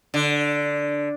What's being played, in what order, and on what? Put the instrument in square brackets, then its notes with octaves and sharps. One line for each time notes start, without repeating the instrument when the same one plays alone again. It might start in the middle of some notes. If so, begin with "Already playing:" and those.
[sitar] D3